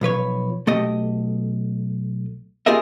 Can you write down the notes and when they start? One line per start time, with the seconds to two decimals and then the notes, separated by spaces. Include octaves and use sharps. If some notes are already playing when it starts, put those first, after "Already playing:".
0.01 B1 F3 B4 C#5
0.67 B1 A3 G4 D#5
2.66 F4 G4 G#4 A#4 D#5 E5